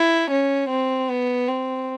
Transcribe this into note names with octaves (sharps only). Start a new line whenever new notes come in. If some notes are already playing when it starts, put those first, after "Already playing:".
Already playing: E4
C#4
C4
B3
C4